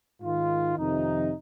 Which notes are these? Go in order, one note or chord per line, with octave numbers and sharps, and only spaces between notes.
G#2 D#3 F4
F2 C3 D#3 D#4